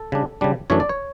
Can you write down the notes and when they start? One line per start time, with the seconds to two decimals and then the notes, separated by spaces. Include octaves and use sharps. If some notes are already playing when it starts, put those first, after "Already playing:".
Already playing: A4
0.12 C#3 G3 D4
0.41 C#3 G3 D4
0.70 F#2 E3 A3 D4 C#5
0.80 D5
0.89 C#5